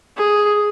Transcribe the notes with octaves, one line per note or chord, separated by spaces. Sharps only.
G#4